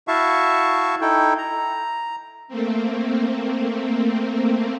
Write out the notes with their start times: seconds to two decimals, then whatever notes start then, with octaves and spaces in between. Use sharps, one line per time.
0.08 E4 F#4 E5 F5 A5 C#6
1.01 D#4 E4 A4 G5
1.38 A#5
2.48 A3 A#3 C4